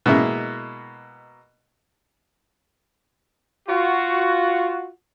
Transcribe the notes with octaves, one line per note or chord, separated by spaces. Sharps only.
B2 G#3 A#3 E4
F4 F#4